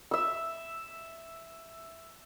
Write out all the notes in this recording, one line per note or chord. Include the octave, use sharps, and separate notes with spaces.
E5 E6